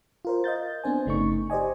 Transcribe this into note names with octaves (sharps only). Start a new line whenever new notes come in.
F4 A#4 C5
D#5 F5 G6 A6
B3 C4 D4 C5 G#5
G1 C#3 A3 D#4 C#6
G4 C5 D5 D#5 G#5